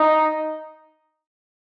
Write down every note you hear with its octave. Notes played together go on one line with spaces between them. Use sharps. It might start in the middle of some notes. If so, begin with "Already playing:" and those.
Already playing: D#4